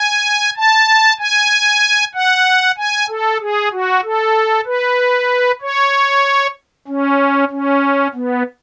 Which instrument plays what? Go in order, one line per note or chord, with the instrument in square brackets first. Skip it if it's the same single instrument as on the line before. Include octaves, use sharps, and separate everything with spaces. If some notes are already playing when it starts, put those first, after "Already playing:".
Already playing: [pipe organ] G#5
A5
G#5
F#5
G#5
A4
G#4
F#4
A4
B4
C#5
C#4
C#4
B3